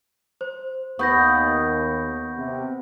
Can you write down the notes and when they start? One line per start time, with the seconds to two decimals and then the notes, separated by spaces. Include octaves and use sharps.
0.41 C5
0.99 D#2 B3 F#5 C#6 G6 A#6
2.37 C3